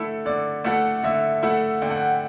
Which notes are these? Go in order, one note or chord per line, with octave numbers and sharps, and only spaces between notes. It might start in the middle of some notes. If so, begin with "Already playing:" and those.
Already playing: D3 A3 E4 A4
D3 D5
A3 E4 A4 F#5
D3 E5
A3 E4 A4 F#5
D3 G5
F#5
G5